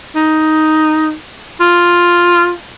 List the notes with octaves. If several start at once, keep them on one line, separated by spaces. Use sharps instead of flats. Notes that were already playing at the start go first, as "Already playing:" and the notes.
D#4
F4